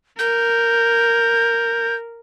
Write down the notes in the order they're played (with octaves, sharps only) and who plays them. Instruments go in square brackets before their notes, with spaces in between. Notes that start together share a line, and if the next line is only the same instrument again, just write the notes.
[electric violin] A#4 [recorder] G6